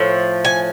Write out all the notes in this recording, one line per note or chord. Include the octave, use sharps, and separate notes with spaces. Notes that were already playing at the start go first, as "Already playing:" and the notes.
Already playing: A2 F3
G#5